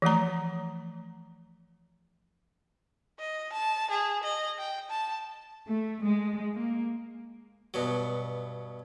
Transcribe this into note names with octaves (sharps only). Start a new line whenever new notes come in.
E3 F3 A3 A#5
D#5
A5
G#4
D#5
G5
A5
A3
G#3
A#3
G2 B2 F#3